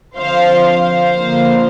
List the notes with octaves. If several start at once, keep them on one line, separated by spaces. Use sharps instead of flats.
D3 F3 C4 C5 F5
C5 F5
D3 F3 A#3